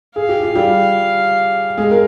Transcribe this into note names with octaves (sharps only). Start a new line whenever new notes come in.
G#4 F5
G4
F4
G3 G4
G#3 G#4
A#4